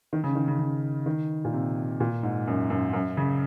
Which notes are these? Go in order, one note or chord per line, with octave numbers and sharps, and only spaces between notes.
D#3
C#3
D#3
C#3
C#3
D#3
A#2
C3
A#2
G#2
F#2
F#2
F#2
C#3